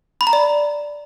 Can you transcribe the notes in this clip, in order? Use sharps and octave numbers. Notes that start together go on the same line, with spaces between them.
B5
A#5
D5